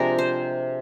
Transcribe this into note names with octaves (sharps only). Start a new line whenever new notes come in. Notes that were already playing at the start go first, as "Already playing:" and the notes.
Already playing: C3 F3 G#3 D4 A#4
C5